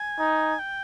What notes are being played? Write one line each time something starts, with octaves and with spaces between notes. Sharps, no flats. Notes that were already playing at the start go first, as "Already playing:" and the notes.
Already playing: G#5
D#4
G5